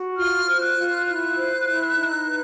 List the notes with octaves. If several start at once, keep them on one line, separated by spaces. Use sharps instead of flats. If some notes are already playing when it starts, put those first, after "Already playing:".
Already playing: F#4
F4 F6
C5
F#6
F4
E4 F#6
C5
E4
D#4
B4